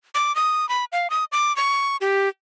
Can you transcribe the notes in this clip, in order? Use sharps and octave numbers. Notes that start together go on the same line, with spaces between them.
D6
D#6
B5
F5
D#6
D6
C#6
G4